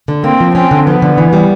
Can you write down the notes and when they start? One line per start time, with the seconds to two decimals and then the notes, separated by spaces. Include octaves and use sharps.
0.08 D3
0.24 A#3 C4
0.41 F3
0.55 C4 C#4
0.71 D3
0.86 F3 B3
1.02 D3
1.18 E3
1.33 G3